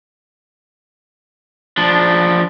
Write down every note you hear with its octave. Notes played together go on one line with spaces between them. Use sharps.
F3 D4